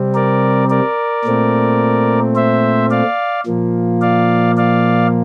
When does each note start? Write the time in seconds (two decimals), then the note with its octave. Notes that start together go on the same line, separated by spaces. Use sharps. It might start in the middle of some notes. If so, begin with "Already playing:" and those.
Already playing: C3 G3 C4
0.14 A#4 D5
0.70 A#4 D5
1.25 A#2 A3 C4
2.35 C5 E5
2.91 D5 F5
3.47 A#2 F3 A#3
4.02 D5 F5
4.57 D5 F5